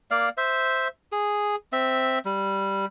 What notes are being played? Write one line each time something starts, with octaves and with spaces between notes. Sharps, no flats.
A#3 D5 F5
C5 E5
G#4
C4 E5
G3